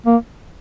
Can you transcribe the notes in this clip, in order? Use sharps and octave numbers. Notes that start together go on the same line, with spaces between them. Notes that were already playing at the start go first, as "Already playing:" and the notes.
A#3